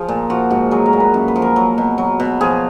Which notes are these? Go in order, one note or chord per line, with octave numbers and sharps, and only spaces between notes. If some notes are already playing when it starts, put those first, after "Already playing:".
Already playing: F3 G#4
A#2
F3 F#4
G#2 F#4
F#3 G#4
A#4
A#2
B4
F#2
B4
F3
A#4
F#3
B2
F#3
B2
F3 G#4